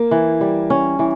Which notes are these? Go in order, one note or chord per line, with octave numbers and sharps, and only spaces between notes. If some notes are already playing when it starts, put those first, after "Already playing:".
Already playing: A#3
E3
G3
C#4
E3